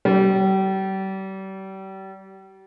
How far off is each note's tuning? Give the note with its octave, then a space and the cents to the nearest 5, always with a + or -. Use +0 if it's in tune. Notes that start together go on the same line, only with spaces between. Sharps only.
G3 -35